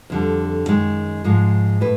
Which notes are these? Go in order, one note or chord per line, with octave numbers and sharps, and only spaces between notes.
F2 D3 G3
F#2 D#3 G#3
G#2 F3 G#3
A2 B4